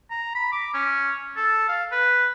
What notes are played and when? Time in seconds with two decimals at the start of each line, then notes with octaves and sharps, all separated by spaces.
0.10 A#5
0.35 B5
0.52 D6
0.74 C#4
1.37 A4
1.69 F5
1.92 B4